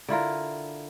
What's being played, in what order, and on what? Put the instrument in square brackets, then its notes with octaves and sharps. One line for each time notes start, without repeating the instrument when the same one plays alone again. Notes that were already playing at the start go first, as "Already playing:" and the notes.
[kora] D3 E4 F4 A#4